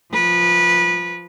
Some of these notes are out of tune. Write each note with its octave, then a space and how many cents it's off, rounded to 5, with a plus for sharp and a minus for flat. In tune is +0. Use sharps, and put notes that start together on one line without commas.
F3 +0 B4 -20